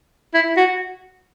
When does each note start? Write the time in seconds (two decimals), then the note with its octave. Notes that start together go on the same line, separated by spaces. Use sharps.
0.34 E4
0.57 F#4